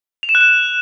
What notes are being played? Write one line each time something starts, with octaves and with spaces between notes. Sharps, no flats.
F7
E7
F#6
E7